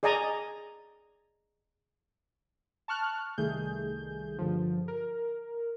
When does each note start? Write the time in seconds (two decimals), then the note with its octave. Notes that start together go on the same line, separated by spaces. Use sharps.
0.03 G#4 D5 D#5 G#5 A#5
2.88 A5 C#6 F6 F#6
3.38 C2 D#3 G3 A3 G#4 G6
4.38 G2 D3 F3
4.88 A#4